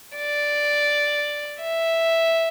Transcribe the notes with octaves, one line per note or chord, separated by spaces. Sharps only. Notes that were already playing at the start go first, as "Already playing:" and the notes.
D5
E5